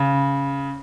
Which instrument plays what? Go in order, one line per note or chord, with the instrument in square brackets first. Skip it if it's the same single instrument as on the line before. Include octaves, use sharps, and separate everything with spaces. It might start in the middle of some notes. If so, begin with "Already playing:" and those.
Already playing: [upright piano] C#3